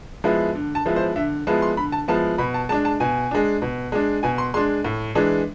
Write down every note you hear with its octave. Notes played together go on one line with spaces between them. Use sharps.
F3 G#3 B3 E4
D3
A5
F3 G#3 B3 E4
C5
D3 E5
F3 G#3 B3 E4 A5
C6
D3 B5
A5
F3 G#3 B3 E4 A5
B2 B5
A5
G#3 D4 A5
A5
B2 G#5
G#3 D4
B2
G#3 D4
B2 G#5
C6
G#3 D4 C6
A2
E3 G#3 D4